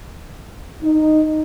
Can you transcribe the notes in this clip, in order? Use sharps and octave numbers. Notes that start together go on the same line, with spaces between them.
D#4